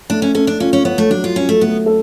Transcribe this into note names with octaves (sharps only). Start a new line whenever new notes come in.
A3 D4
C#4
C#4 A4
D4
C#4 F4
C#4
B3 C#5
A3
F#3 D4
F4
C#4 F4
A3
A3 B3
A4